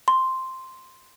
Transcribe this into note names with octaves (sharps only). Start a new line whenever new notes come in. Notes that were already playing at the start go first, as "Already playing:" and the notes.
C6